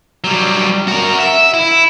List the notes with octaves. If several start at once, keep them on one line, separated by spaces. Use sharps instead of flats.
F#3 G3
F#4 A#4
E5
E4